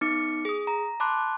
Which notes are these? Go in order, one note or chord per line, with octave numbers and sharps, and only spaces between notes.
B3 D#4 D6 C#7
G#4 D#6
A#5
A5 B5 C6 D6 F#6